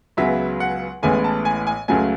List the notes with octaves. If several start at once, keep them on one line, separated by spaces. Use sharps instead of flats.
C#2 C#3 F#3 B3 E5
F#5
A1 A2 E3 G#3 B3 G#5
A5
G#5
G#5
C#2 C#3 F#3 A3 G#5